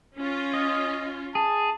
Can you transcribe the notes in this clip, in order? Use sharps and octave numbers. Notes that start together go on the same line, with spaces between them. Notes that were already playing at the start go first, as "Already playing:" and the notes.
C#4 F4
D#5
G#4 A5